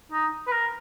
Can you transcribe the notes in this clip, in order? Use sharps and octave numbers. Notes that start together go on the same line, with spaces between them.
D#4
B4
A#4